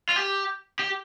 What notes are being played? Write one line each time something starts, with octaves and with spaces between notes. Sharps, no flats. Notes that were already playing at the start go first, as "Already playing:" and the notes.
F4
G4
G4